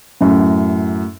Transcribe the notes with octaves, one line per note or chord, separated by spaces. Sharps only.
F#2 A2